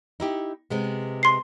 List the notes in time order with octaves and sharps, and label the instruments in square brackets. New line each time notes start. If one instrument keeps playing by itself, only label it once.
[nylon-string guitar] D#4 E4 G4
C3 G#3 B3
[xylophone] C6 C7